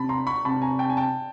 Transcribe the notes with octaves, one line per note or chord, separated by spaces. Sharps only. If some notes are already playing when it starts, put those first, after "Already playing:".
Already playing: C3 A5 B5
A#5 C6
B5 C#6
C3 A5 B5
G#5 A#5
G5 A5
G#5
G5 A5